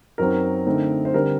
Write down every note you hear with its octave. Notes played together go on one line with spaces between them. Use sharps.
F#2 F#3 C4 D#4 A#4
D3 A3 C4 D#4
C5
D3 G3 C4 A#4